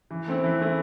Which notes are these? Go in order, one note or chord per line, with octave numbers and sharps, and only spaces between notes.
E3
A3 C4 E4
E3
A3 C4 E4